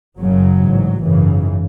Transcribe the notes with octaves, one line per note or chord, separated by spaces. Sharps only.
F#1 F#2 C#3 F#3
A1 G#2
G#1 F#2 C#3 E3